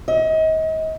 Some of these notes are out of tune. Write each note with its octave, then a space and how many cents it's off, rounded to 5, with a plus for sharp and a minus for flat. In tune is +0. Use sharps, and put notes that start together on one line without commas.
D#5 +35